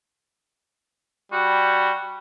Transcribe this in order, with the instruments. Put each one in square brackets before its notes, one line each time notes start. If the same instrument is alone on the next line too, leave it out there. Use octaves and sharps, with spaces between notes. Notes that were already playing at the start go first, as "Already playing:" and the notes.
[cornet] G3 [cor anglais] F#4